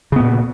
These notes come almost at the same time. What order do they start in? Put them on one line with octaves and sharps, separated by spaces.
C#3 B3 A#2